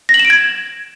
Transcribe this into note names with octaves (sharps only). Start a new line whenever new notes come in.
A#6
F#7
E7
D7
G#6